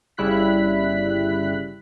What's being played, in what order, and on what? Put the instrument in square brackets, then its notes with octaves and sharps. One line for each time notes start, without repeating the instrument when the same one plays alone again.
[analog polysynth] G1 C#3 G3 E4 F#6 B6